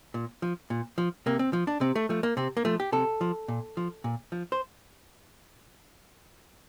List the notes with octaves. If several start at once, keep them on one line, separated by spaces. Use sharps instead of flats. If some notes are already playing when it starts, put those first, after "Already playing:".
A#2
F3
A#2
F3
C3 A#3
C4
F3
D4
C3 C4
A3
F3 A3
A#3
C3 C4
A#3
F3 A3
G4
C3 A4
F3
A#2
F3
A#2
F3
C5